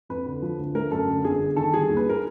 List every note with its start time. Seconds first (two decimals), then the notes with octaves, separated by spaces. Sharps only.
0.09 F2 B4
0.26 D3
0.42 F3
0.59 D2
0.75 A3 A#4
0.91 F#2 A4
1.08 D3
1.24 G1 G#4
1.40 G1
1.56 D#3 A4
1.74 G3 G#4
1.89 D#2
1.97 B4
2.09 A#4